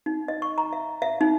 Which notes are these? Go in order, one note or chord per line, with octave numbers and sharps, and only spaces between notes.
D#4
D#5
C#6
A#5
E5
E5
D#4